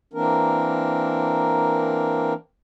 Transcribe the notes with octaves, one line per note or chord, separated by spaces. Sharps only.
E3 A#3 C4 D4 A#4